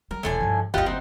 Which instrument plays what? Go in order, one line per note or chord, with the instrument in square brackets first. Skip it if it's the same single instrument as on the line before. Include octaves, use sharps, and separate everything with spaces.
[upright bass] F#3 [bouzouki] A#4
[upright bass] E1 E2 [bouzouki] A2 D3 G#5
[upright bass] G2 F3
[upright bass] F#1 D2 [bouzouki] D#4 F#5 [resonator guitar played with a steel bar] F4 G4
[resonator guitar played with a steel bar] C4